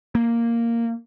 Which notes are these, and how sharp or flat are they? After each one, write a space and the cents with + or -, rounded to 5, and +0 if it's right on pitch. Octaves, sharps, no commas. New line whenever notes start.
A#3 -5